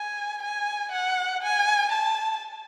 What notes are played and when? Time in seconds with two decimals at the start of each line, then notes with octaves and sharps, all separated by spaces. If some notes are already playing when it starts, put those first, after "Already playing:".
Already playing: G#5
0.43 G#5
0.92 F#5
1.43 G#5
1.92 A5